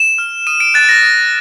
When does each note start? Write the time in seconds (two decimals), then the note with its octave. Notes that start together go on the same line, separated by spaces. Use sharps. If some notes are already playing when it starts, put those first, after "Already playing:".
Already playing: E7
0.18 F6
0.47 D#6 D#7
0.60 D7
0.74 F#6 A6
0.89 A#6
1.03 D#6